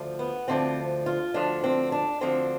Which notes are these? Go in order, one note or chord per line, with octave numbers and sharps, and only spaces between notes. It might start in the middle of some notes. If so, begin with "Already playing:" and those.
Already playing: D2 D3 F3
B3
D2 D3 F3 C4
F4
D2 D3 F3 D4
C4
D4
D2 D3 F3 C4